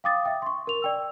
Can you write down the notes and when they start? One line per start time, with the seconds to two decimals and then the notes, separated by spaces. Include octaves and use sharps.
0.04 F5 G5 D6 D#6 A6
0.25 E5 G5
0.42 C6 C#6
0.67 A#4 F7
0.82 D5 G5 E6